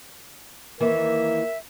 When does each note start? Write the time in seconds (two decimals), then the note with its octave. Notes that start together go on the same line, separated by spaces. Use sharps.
0.80 D#2 E3 A#3 A#4 E5